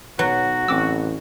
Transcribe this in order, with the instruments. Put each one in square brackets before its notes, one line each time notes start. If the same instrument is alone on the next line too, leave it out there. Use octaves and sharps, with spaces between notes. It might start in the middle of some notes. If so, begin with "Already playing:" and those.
[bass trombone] B1 [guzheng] F#3 [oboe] F#4 [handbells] B4
[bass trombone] A1 [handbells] C4 D6 E6